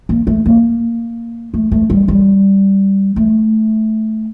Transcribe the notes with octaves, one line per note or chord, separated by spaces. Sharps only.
A#3
A3
A#3
A3
A3
G3
G3
A3